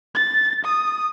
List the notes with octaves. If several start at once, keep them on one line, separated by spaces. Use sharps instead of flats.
A6
D#6